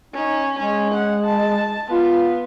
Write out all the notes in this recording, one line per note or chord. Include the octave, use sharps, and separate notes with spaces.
C#4 D#4
G#3 C#4
F#5
A5
B3 F4